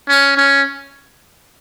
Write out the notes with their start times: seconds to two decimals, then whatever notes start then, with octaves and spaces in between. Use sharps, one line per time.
0.09 C#4
0.37 C#4